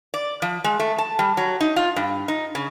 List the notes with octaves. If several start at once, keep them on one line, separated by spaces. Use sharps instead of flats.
D5
F3
G#3
A3
A5
G3
F#3
D#4
F4
G2
D#4
C#3